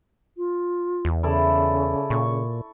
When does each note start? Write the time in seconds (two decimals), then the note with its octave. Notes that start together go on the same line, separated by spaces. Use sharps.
0.37 F4
1.05 E2
1.23 C#3 E4 A4 D5
2.10 A#2 C#6